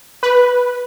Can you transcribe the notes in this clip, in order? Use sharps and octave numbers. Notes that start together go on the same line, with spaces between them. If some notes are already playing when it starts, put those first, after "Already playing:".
B4